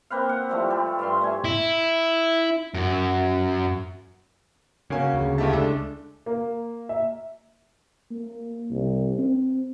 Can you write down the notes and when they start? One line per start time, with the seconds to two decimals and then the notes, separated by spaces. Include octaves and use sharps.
0.10 A#3 C4 B4 F5
0.29 F#5
0.49 F3 G3 A3
0.70 G3 A4
0.99 G2 E5 F5 C6
1.21 A3 G#5
1.45 E4
2.74 F#2
4.90 C#3 A#3 C#4 F#4 G#5
5.13 D2 C#3
5.38 C#2 A3 E4 G4 A5
5.53 C#2 G#3 D4 A4
6.26 A#3
6.89 E5
8.11 A#3
8.70 C2
9.19 C4